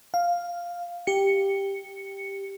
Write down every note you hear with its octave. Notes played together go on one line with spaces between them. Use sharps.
F5
G4 C#7